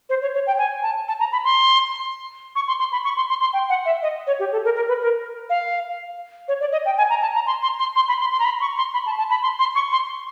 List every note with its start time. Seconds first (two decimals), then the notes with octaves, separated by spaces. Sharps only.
0.09 C5
0.22 C#5
0.34 C#5
0.47 G5
0.58 G#5
0.83 A5
1.08 A5
1.20 A#5
1.32 B5
1.44 C6
2.55 C#6
2.68 C6
2.79 C6
2.92 B5
3.04 C#6
3.16 C6
3.29 C6
3.41 C6
3.53 G5
3.70 F#5
3.86 E5
4.03 D#5
4.27 C#5
4.39 G4
4.52 A4
4.64 A#4
4.76 A#4
4.88 B4
5.01 A#4
5.50 F5
6.48 C#5
6.61 D5
6.72 D#5
6.86 G5
6.98 G#5
7.10 A#5
7.22 A5
7.35 A#5
7.47 C6
7.63 C6
7.79 C6
7.96 C6
8.08 B5
8.20 C6
8.32 C6
8.39 A#5
8.45 B5
8.61 C#6
8.77 C6
8.94 B5
9.06 A5
9.18 A5
9.30 B5
9.42 C6
9.59 C6
9.75 C#6
9.92 C6